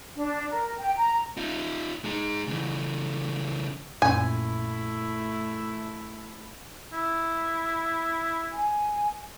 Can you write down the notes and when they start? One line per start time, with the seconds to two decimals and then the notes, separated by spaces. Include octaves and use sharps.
0.17 D4
0.50 A#4
0.78 G5
0.97 A#5
1.37 D#4 F4
2.04 G#3 D#4
2.47 C#3 E3
4.02 A#1 F#2 A#2 A3 C#4 E4 G#5
6.93 E4
8.52 G#5